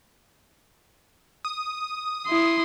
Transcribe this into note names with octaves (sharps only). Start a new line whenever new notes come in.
D#6
E4 C6